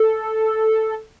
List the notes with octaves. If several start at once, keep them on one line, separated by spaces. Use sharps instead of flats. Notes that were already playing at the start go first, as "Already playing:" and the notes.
Already playing: A4